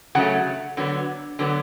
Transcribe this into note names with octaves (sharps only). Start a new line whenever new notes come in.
C#3 F#3 A3 F#5
D3 F#3 B3
D3 F#3 B3